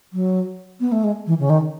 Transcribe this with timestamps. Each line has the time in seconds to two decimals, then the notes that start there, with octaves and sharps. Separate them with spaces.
0.13 F#3
0.80 B3
0.92 A3
1.03 G#3
1.26 E3
1.39 C#3
1.49 D#3